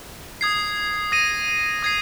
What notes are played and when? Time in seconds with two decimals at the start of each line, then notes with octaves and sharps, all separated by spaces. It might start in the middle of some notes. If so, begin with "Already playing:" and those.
0.41 D#6 G#6 C7
1.12 D#6 A#6 D#7
1.83 D#6 G#6 C7